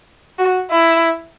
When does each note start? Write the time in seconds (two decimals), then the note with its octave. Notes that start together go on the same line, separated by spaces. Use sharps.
0.39 F#4
0.71 E4